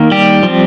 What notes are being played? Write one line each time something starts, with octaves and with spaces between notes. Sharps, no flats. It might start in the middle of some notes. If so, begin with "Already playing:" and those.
Already playing: D#3 A#3
G3 G4
F3 C4